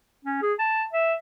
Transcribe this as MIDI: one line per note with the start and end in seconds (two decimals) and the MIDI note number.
0.25 0.38 61
0.42 0.53 68
0.59 0.84 81
0.93 1.14 76